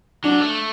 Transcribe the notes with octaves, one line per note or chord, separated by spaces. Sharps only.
F#3 D4
A3